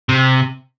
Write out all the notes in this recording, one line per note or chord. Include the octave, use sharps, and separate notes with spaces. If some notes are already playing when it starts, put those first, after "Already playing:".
C3